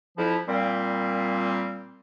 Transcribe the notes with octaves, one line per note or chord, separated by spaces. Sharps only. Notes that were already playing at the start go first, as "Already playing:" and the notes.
F2 F3 E4
A#2 G3 C4